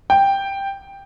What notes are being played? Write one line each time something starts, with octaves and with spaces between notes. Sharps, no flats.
G5